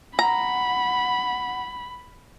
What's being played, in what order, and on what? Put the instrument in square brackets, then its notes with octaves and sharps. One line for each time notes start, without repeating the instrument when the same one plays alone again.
[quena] F#5 [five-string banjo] A#5 [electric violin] B5